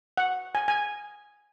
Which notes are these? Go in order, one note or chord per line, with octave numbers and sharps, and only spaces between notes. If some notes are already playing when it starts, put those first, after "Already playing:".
F#5
G#5
G#5